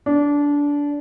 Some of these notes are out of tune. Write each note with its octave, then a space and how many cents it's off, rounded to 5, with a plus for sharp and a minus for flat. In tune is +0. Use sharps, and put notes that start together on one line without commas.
D4 -20